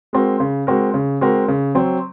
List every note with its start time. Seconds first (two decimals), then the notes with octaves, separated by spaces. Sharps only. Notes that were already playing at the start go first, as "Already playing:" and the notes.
0.13 G#3 C4 F#4 A#4
0.40 C#3
0.67 G#3 C4 F#4 A#4
0.94 C#3
1.21 G#3 C4 F#4 A#4
1.48 C#3
1.75 F#3 C4